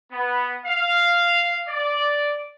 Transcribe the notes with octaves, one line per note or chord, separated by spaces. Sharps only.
B3
F5
D5